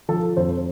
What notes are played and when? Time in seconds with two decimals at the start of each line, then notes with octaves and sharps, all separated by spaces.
0.09 F3 A4
0.37 F2 C5